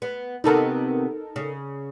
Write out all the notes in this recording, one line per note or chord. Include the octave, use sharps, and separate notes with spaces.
B3
C3 D#3 B3 D#4 A4 A#4
C#3